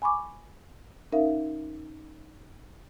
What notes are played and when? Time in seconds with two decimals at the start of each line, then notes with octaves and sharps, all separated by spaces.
0.02 G#5 B5 C#6 D6
1.12 C#4 D#4 A#4 E5 F5